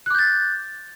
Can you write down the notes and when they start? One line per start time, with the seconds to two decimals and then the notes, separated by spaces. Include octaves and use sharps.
0.06 F#6
0.10 D6
0.14 G6
0.19 A6